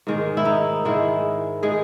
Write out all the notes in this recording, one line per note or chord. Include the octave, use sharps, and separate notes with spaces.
G#2 D#3 G#3
E4
D#4
G#2 D#3 G#3 E4
D#3 G#3 G#4